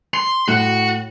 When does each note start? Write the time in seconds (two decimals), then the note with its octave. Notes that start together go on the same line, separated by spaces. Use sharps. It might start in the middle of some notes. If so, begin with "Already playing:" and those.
0.14 C6
0.48 A2 F#4 F#5